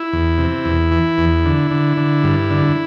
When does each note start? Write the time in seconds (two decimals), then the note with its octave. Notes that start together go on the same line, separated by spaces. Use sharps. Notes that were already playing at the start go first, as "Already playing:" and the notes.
Already playing: E4
0.13 E2
0.38 C3
0.65 E2
0.91 E3
1.18 E2
1.45 D3
1.71 D3
1.97 D3
2.24 G2
2.50 D3